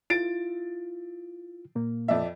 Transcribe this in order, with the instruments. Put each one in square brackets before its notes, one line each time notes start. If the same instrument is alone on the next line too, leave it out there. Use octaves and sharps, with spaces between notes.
[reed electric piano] E4 F4 [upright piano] A6 D7
[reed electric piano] A#2 A#3
[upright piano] F2 D5 E5